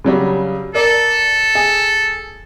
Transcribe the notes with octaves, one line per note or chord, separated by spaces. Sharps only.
C#3 F#3 G3
A4 A#4 D5
G#4